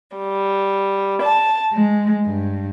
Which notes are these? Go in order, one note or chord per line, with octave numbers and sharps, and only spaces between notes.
G3
A5
G#3
G2